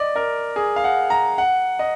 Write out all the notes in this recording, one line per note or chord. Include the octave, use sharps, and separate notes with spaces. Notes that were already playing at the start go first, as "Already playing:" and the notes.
Already playing: D5 D#5
A#4
G#4
F5
F#5
A#5
F#5
D#5